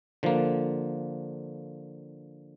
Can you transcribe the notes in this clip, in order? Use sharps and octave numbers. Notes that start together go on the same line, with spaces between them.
D3 F3 A#3